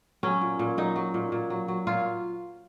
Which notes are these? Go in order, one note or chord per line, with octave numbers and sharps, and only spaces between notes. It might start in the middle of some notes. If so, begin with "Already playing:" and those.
F#3 C#4
A#2
A#2
F#3 D#4
F#3
A#2
A#2
F#3
F#3
A#2 F4